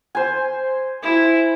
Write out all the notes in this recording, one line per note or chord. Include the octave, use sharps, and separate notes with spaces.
C5 G#5
E4